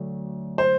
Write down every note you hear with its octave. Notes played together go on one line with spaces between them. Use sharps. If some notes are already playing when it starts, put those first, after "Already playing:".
Already playing: D2 D3 F#3 A3 D4
C5